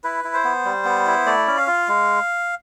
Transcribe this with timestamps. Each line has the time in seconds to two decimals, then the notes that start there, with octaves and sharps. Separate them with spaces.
0.04 E4 B4
0.24 E4
0.34 C5
0.45 B3
0.65 G3
0.85 B3
1.07 E4
1.26 A3 D5
1.47 C#4
1.58 F5
1.68 F4
1.88 G#3